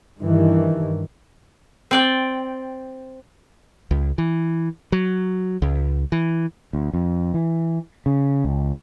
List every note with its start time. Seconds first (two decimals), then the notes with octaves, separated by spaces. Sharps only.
0.19 G2 D#3 E3
1.91 C4 D5 G5
3.91 C#2
4.18 E3
4.92 F#3
5.62 C#2
6.12 E3
6.73 D2
6.94 F2
7.34 E3
8.06 C#3
8.44 C#2